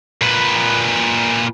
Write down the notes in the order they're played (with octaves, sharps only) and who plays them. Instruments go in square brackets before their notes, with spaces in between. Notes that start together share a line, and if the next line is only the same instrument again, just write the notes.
[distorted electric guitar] A#2 B4